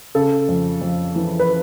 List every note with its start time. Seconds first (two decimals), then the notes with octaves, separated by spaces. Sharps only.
0.15 C#3 A4
0.49 F2
0.82 F2
1.16 E3
1.39 B4